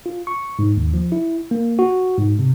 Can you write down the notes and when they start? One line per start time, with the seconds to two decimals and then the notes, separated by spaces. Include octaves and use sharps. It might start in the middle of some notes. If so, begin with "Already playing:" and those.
0.06 F4
0.27 C#6
0.59 G#2
0.77 D#2
0.94 F3
1.12 E4
1.51 A#3
1.79 F#4
2.17 G#2
2.39 C3